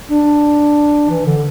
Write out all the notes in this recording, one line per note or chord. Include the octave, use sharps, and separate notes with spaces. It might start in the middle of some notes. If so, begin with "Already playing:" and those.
D4
E3
D3